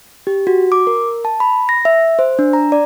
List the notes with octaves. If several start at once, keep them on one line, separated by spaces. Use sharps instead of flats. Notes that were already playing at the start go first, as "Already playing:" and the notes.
G4
F#4
D6
A#4
A5
B5
A#6
E5
C5
D4
A#5
D5